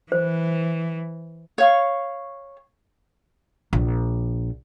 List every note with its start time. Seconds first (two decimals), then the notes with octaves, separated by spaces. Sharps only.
0.12 E3 C5
1.58 C#5 F5 C#6
3.73 A#1